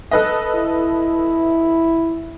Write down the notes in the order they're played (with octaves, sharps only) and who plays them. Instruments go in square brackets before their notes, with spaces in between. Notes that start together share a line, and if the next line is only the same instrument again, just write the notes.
[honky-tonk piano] A4 B4 D#5
[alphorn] E4